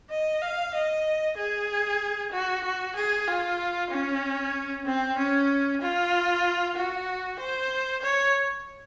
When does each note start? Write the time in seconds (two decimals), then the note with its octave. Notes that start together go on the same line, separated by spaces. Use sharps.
0.10 D#5
0.42 F5
0.74 D#5
1.37 G#4
2.32 F#4
2.64 F#4
2.96 G#4
3.27 F4
3.90 C#4
4.85 C4
5.18 C#4
5.81 F4
6.76 F#4
7.39 C5
8.02 C#5